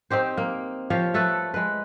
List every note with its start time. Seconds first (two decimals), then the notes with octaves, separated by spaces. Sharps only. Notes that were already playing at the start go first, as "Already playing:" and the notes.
0.10 C4 D#4 G4 C5
0.37 A#3
0.90 F3 G4 C#5 F5
1.14 A3 A4 B4
1.54 G#3 B4